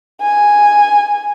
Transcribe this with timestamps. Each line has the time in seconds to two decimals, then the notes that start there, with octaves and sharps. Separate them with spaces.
0.22 G#5